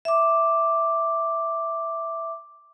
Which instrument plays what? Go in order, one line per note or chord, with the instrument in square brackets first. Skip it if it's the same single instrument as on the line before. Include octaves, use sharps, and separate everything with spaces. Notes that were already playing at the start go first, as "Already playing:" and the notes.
[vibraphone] E5 D6